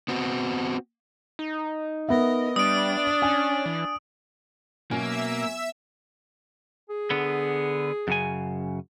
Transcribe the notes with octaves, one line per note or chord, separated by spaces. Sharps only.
B3 C4 F#4
D#4
B3 A#4 D#5 E5
G3 D4 D#6 D7
C#4 G#5
E3
B2 F#3 A#3 C#4 E5 G#5 E6
G#4
D3 B3
F#2 C#3 G#5